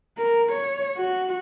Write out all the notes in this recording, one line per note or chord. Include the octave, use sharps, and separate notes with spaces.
A#4
C#5
F#4